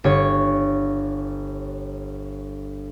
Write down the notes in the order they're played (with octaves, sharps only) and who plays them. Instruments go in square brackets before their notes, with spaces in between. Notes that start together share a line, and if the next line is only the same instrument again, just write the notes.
[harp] G1 C#5 C#6